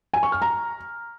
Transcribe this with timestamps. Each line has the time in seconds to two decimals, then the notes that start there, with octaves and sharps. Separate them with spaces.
0.14 G#5
0.23 C#6
0.32 F6
0.42 A#5